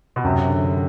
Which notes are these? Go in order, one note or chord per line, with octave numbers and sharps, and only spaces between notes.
B2
F#2 C3
D3